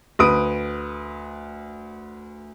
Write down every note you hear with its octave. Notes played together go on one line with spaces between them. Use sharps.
D2 B4 D#6 D7